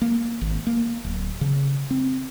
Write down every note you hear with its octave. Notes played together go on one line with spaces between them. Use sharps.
A#3
G#1
A#3
D1
C#3
C4